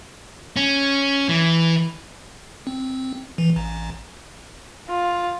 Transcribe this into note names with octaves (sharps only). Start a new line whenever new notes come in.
C#4
E3
C4
E3
A1
F4